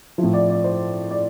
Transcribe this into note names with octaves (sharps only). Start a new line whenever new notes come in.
F3 E4
A2
D5
D5
C5
D5